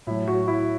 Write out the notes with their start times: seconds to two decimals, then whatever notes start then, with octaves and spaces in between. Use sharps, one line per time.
0.07 A2 F#3 E4
0.28 F#4
0.48 E4